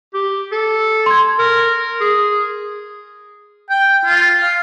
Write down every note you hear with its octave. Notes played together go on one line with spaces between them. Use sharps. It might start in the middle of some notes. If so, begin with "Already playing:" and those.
G4
A4
C6 G#6
A#4
G#4
G5
F4
F5